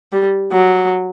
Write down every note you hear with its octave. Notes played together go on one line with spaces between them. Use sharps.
G3
F#3